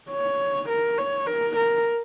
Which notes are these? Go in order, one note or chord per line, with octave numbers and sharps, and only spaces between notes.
C#5
A#4
C#5
A#4
A#4